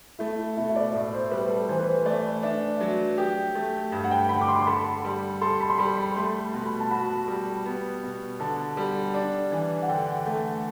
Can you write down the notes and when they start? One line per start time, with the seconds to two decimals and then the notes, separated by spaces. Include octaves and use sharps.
0.19 A3 E4
0.39 E4
0.57 B2 E4
0.69 E5
0.76 D5
0.93 A2 E5
1.13 C5
1.31 G3 B4
1.50 A4
1.68 E3 C5
1.79 B4
1.87 C5
2.06 A3 D5
2.43 D4 E5
2.80 F#3
3.18 G4
3.55 A3
3.92 G2
4.04 F#5
4.11 G5
4.29 D3 B5
4.41 D6
4.48 C6
4.59 C6
4.67 A4 B5
5.05 G3
5.41 A4 C6
5.60 B5
5.70 C6
5.78 G3 B5
5.97 B5
6.15 A3 C6
6.54 B2
6.66 B5
6.80 A5
6.91 F#4 B5
7.28 G3
7.65 B3
8.03 B2
8.40 D3 A5
8.77 G3
9.14 D4
9.52 E3
9.82 F#5
9.88 D3 G5
10.26 A3